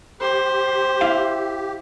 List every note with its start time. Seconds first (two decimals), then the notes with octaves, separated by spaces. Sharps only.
0.20 G4 C5
1.01 E4 F5